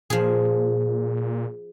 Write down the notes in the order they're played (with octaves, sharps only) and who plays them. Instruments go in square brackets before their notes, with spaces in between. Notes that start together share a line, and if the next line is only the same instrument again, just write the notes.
[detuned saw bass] A#2 [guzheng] F3 G#4